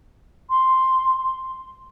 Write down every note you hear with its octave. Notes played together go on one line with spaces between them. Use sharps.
C6